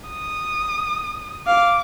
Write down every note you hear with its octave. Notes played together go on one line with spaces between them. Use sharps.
D#6
F5 D6